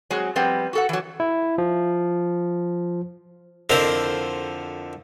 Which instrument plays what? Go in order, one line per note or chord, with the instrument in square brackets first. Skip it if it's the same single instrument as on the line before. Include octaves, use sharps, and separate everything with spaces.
[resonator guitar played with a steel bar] F#3 G#3 C4 G#4
F3 G3 B3 C4
F#4 A4 F#5
E3 F#3
[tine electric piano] E4
F3
[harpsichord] F2 D3 E4 A#4 C5 C6